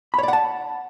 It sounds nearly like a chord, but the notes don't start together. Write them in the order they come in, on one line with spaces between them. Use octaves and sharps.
B5 C#5 D5 F#5 A5